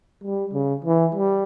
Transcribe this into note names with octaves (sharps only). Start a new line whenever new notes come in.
G3
C#3
E3
G3